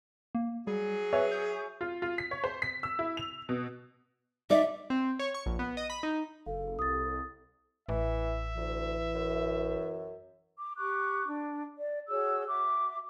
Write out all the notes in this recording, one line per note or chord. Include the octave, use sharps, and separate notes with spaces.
A#3
F#3 G3 G#4
B4 C#5 E5 G#5
G6
F4
F4
B6
C#5
C5
B6
E6
E4
F7
B2
D#4 D5 E5
C4
C#5
C#6
A#1
B3
D#5
B5
D#4
F#1 A4 F5
C2 D#6 A6
A1 E3 E5
D2 E3
F#2
D6
G4 C#6 D6 F#6
D4
D5
F#4 G#4 C#5 E6
F#4 E5 D6